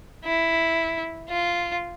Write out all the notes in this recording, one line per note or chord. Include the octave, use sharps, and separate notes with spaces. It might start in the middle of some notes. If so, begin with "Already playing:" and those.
E4
F4